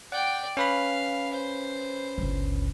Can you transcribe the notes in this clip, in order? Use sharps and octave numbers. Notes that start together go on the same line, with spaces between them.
D5 F#5 G5
C#4 B4 F5 B5
C5
G1 C#2